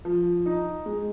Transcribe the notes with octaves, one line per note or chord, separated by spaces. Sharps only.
F3
D#4
G#3